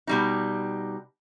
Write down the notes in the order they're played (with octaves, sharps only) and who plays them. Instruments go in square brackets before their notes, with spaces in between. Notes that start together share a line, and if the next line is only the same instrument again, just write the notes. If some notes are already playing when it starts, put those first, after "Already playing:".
[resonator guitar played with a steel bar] B2 G3 D#4